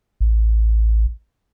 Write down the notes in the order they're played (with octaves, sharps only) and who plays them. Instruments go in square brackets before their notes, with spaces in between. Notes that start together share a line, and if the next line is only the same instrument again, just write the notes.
[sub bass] A1